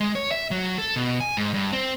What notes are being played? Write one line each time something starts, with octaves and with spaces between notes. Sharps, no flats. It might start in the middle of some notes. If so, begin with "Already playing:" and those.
G#3
C#5
E5
F#3
A4
B2
G#5
G#2
G2
C4